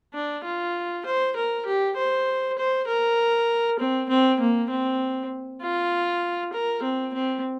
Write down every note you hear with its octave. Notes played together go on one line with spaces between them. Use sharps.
D4
F4
C5
A#4
G4
C5
C5
A#4
C4
C4
A#3
C4
F4
A#4
C4
C4